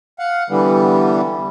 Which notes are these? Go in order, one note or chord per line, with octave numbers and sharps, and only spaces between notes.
F5 F#5
D3 E3 G3 B3